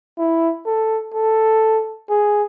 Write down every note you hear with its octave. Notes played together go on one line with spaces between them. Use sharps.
E4
A4
A4
G#4